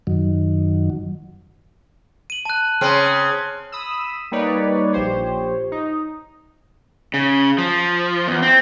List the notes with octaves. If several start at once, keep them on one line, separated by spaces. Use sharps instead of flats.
F#2 D#3 F#3
D#7 F#7
A5 F#6
C#3 C4 C6 F6
B5 D#6 E6
G3 A#3 D#4 B4 C#5 D5
A#1 F3 G4 C5 C#5
D#4
C#3
F3
E2
C4